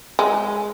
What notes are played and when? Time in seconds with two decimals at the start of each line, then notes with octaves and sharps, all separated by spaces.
0.19 G#3